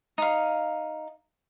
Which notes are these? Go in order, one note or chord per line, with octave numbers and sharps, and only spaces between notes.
D#4 F5